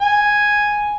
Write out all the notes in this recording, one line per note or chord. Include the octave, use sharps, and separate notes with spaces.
G#5